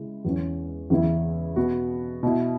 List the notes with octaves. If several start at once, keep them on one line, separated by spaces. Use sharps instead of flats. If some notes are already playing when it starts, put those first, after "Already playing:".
Already playing: C#3 G#3 E4
E2 E3 C#4
E2 C#3 E3 B3 E4
B2 B3 F#4
B2 B3 E4